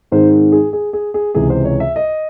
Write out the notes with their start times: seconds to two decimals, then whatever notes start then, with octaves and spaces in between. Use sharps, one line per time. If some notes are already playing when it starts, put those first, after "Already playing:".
0.12 G#2 D#3 G#3 C4 C5
0.52 G#4
0.73 G#4
0.93 G#4
1.14 G#4
1.35 C#2 C3 E3 G#4
1.50 C5
1.65 C#5
1.80 E5
1.96 D#5